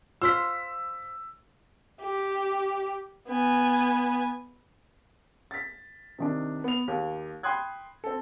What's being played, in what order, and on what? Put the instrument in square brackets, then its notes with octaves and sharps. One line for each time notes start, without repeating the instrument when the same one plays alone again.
[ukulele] F4 C5 [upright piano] E6 B6
[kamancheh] G4
B3 G#5
[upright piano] A6 B6
C3 D#3 D4
B3 F7
D#2
G5 B5 C6 D#6 F#6 G#6
C4 A4